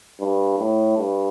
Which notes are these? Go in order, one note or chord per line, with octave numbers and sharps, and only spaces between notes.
G2
A2
G2